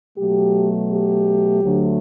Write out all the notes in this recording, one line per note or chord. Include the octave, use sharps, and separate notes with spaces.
B2 F#3 A3 G4
G4
D2 D3 F#3 A3